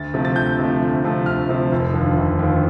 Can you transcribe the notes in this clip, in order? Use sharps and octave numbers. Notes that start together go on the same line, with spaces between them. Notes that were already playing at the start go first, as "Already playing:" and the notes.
Already playing: D2 A6
C3 F3 A3
A6
D2 G6
C3 F3 A3
D2
C3 F3 A3
D2 F6
C3 F3 A3
F1
D#2 D3 F3
F1
D#2 D3 F3